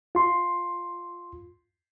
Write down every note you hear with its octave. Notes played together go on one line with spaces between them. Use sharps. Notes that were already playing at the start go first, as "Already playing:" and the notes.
F4 C6